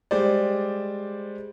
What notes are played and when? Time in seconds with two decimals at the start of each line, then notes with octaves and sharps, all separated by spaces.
0.11 G3 G#3 C5 D5